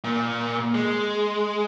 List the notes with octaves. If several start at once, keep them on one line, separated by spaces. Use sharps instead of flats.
A#2
G#3